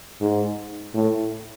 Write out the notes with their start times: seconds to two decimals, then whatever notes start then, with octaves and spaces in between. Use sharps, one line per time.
0.21 G#2
0.95 A2